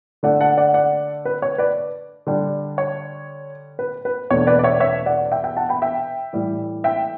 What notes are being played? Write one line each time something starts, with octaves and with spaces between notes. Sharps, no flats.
D3 A3 D4 D5 F#5
F#5 A5
D5 F#5
D5 F#5
B4
C#5
B4 D5
D3 G3 D4
C#5
B4
B4
E2 B2 A3 D4 C#5
B4 D5
D5
C#5 E5
C#5 E5
D5 F#5
E5 G5
E5 G5
F#5 A5
G5 B5
E5 G5
A2 E3 G3
E5 G5